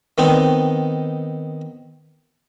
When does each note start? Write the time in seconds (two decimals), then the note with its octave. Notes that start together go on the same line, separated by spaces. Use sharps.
0.18 D#3 B3 C4 D#4